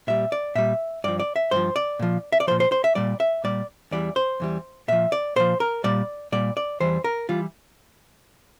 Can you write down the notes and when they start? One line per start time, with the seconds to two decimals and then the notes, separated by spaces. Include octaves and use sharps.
0.07 A#2 G3 E5
0.32 D5
0.55 A#2 G3 E5
1.04 G2 F3 D5
1.20 D5
1.36 E5
1.51 G2 F3 C5
1.76 D5
1.99 A#2 F3
2.32 E5
2.40 D5
2.47 A#2 F3 C5
2.60 C5
2.72 C5
2.84 E5
2.95 A#2 G3 D5
3.20 E5
3.44 A#2 G3 D5
3.91 E2 E3 G3 D5
4.16 C5
4.40 E2 E3 G3
4.88 A#2 F3 E5
5.12 D5
5.36 A#2 F3 C5
5.60 A#4
5.84 A#2 G3 D5
6.32 A#2 G3 D5
6.57 D5
6.80 E2 E3 G3 C5
7.04 A#4
7.29 E3 G3 F4